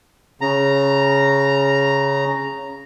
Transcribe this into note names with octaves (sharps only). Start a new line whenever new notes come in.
C#3 A#5